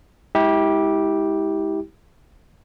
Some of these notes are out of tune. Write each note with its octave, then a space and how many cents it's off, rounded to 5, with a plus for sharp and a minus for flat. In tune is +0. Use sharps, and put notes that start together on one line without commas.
G#3 +0 E4 -35 G4 +0